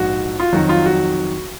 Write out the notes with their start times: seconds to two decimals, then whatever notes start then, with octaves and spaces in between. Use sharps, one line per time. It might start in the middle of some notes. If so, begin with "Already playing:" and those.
Already playing: A#1 G#2 F3 F#4
0.40 F4
0.53 F2 D#3 F#3 F#4
0.69 F4
0.86 F#4